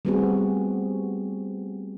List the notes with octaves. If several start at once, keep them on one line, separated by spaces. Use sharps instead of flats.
G3 A3 B3 C4 F#4 G#4